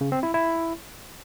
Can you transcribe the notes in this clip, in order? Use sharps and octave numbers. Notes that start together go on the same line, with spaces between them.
C#3
C4
E4
E4